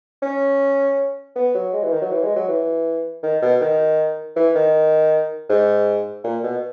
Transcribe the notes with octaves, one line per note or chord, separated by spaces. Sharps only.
C#4
B3
F#3
G#3
E3
D#3
F#3
E3
G#3
F#3
E3
D#3
B2
D#3
E3
D#3
G#2
A#2
B2